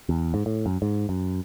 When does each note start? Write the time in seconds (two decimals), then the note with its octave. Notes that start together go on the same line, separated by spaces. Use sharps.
0.09 E2
0.34 G#2
0.46 A2
0.66 F#2
0.82 G#2
1.09 F#2